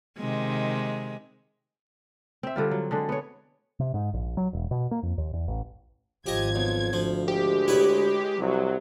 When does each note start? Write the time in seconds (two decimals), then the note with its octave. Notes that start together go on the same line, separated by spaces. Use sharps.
0.18 C3 D#3 G#3
2.43 C4 E5
2.56 D3 G3 F4
2.71 F#3
2.91 D3 G#3 D4
3.09 B3 C#5
3.80 C3
3.94 G#2
4.13 A#1
4.37 F#3
4.53 E1
4.71 B2
4.91 A#3
5.03 F2
5.18 D#2
5.33 E2
5.48 A1
6.26 G#1 F3 G4 D#5 G#6
6.55 B1
6.93 D2 F3
7.28 G#3 G4
7.68 E4 B4 C#5
8.40 C2 F#3